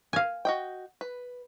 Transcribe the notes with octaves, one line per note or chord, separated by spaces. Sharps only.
F5 G#5
F#4 D#5 G5
B4